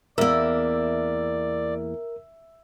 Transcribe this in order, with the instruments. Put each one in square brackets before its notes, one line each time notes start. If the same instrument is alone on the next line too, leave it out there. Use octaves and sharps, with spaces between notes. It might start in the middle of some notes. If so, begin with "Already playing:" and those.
[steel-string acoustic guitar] E2 A#3 [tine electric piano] A#4 [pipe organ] D5 [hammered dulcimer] E5